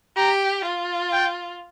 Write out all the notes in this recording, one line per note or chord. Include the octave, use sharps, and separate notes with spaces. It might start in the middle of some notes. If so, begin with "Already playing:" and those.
G4 A#5
F4
G5